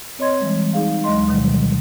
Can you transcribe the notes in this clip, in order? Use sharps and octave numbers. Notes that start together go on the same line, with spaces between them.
C4 C#5 D#5 C6 G#6
E3 G3 G#3
D#4 G#4 F5
D2 F#3 G#3 D#5 C6
B2 D#3 F#3 G3